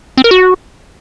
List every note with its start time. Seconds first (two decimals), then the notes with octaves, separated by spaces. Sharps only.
0.17 C4
0.24 A#4
0.31 F#4